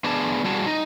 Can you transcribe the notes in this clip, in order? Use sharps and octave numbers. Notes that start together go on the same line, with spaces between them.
B3 D4 G#4 A5
G3 F#4 G#4 A5
D#4